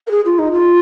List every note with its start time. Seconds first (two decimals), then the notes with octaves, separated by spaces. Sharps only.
0.07 A#4
0.10 G#4
0.25 F4
0.38 D#4
0.52 F4